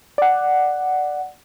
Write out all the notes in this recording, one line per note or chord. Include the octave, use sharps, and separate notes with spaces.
D5 F#5